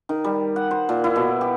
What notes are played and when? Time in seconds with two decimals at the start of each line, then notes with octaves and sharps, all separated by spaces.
0.09 D#3
0.24 G3
0.56 F#5
0.71 C5
0.89 A#2
1.04 E4
1.16 B2
1.41 G4